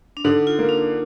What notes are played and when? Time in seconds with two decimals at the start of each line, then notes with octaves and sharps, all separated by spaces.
0.17 D4
0.25 D3 D#4
0.47 F4
0.59 A#3
0.69 D4